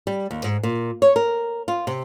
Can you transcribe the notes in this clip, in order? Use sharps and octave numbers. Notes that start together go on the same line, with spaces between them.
G3
D#2
G#2
A#2
C#5
A#4
F4
C3